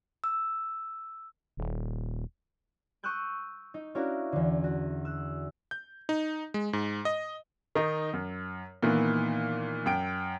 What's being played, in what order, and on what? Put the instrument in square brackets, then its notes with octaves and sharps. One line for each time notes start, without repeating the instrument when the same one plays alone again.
[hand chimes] E6
[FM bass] D#1
[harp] C#6 D#6 E6 F#6 G6 D7
D#4
C#4 D4 E4 F#4 A#4 F5
E2 D3
F#4
E6 F#6
[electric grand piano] G6
D#4
G#3
G#2
D#5
[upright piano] D#3 D#4
F#2
A#2 D#3 E3 B3
F#2 G5 D7